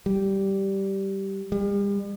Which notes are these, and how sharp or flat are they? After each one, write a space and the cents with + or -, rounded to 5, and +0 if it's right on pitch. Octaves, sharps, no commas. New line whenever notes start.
G3 -10
G3 +40